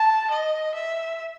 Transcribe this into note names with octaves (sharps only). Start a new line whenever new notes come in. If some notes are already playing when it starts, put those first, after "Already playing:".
Already playing: A5
D#5
E5